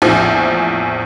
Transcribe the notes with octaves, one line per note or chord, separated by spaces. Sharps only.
A#1 E2 A2 F3